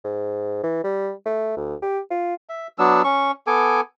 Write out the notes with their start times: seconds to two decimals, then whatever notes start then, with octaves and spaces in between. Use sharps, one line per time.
0.04 G#2
0.63 E3
0.84 G3
1.26 A3
1.57 D2
1.82 G4
2.11 F4
2.49 E5
2.78 F#3 B3 D4 E6
3.04 C#4 C#6
3.47 B3 A4 G#5 D6